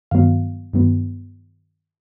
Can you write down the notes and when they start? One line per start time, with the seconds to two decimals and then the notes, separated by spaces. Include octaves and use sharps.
0.11 G2 D#3 F#3 B3 F5
0.73 G2 D#3 F#3 B3